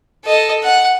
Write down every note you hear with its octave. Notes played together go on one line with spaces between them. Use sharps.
A4 D#5
F#5